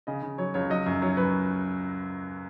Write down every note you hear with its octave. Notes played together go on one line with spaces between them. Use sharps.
C#3 D#5
C#3
F#3 C#5
C#2 C#5
F#3 D#5
F#2
F#3 C#5
F#2 B4